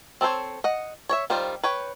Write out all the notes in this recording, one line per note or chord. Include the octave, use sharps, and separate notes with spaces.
C4 A4 A#4 C5 C#5
D#5 F#5
C#5 D5 E5
D#3 G3 F4 C5
B4 C#5 G5